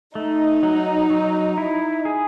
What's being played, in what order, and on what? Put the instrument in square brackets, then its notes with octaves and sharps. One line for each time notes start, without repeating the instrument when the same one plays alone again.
[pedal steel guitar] A3 [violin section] D#4
[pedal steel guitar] F#3
F#3
E4
G#4